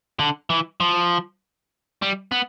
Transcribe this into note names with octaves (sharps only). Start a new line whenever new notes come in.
D3
E3
F3
G3
B3